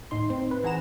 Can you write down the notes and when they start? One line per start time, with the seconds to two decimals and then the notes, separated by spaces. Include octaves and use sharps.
0.11 D#2 A2 D#4 C6
0.30 C4
0.51 B4
0.64 E3 G#4 F#5 A#5 E7